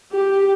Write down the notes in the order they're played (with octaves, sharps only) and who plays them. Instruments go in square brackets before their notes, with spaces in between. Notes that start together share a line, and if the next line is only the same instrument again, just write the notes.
[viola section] G4